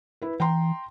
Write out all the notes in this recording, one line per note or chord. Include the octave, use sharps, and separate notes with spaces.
E4 B4
E3 G5 A#5 C6